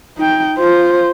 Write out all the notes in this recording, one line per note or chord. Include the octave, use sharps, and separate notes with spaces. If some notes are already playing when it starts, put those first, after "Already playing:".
D#4 G5
F4 C5